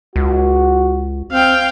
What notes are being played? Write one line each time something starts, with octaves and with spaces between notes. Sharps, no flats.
C#2 F#4
C4 F5 G5